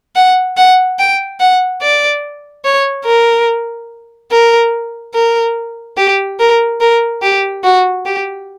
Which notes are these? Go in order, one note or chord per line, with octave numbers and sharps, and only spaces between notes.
F#5
F#5
G5
F#5
D5
C#5
A#4
A#4
A#4
G4
A#4
A#4
G4
F#4
G4